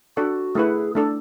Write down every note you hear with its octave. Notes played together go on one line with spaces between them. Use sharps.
D4 F#4 A4 D5 F#5
A3 E4 G#4 B4 F#5
A3 D4 A4